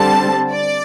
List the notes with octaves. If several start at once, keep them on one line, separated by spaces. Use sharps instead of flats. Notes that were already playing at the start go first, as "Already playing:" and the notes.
Already playing: D3 G3 C4 A5
D5